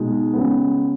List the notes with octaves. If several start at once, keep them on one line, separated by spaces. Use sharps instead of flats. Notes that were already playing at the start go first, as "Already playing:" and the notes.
Already playing: B2 G#3 D#4
C#3 G#3 B3